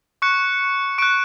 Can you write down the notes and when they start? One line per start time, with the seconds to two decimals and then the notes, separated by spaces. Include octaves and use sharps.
0.22 C#6 F#6 C#7
0.98 C#6 F#6 D7